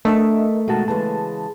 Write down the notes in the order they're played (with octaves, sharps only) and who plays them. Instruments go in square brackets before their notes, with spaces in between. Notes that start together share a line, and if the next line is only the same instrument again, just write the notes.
[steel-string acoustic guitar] D2 D4 [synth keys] A3 [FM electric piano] A#4 D#5 E5
[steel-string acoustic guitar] B2 D#3 F#4 [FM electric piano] G#3 A5
[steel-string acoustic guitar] C#3 E3 G#3 [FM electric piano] A5